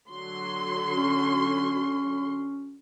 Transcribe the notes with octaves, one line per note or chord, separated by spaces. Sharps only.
D3 F#3 C6
C#4